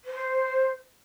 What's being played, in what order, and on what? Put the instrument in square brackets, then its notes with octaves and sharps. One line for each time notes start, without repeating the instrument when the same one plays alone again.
[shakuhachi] C5